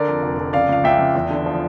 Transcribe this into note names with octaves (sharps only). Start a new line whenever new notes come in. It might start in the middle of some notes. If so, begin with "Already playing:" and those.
Already playing: D3 A#4 D5
F2
F1
F2
C#3 D5 F5
C#2 F5
C#2 E5 G5
C#2
E2
D3
F3